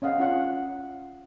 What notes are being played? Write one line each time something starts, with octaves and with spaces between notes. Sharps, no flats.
C#4 D#5 F5 F#5
C#4 F4 F#5